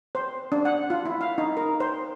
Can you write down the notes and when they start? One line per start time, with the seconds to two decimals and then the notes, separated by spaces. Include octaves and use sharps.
0.15 C5
0.52 D4
0.65 F#5
0.90 F4
1.06 E4
1.21 F5
1.38 D#4
1.57 A#4
1.80 C5